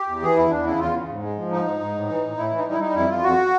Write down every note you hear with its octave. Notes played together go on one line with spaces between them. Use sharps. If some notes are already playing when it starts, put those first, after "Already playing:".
Already playing: G4
E2
E3 G#4
E2 E4
E2 D4
C#3 E4
E2 F4
C#3
G#2
G#3
F3
G#2 D#4
G#2
G#2
A2
E3
A2
A2 E4
E3
D#4
G3
E4
G3 D#4
F2 E4
F2 F4
F2 F#4